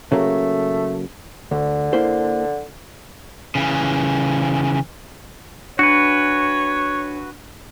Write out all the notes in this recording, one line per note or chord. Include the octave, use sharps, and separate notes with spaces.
C#3 F#3 A3 A#3
D2 D3
A#3 E4 C5
C#3 E3
D4 F#4 B4 C#5 C#7